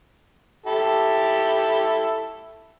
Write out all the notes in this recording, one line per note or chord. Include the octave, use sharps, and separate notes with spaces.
E4 G4 A4